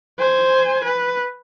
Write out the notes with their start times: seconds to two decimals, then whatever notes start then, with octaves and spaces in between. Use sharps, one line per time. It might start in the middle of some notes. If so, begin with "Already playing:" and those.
0.18 C5 G#5
0.84 B4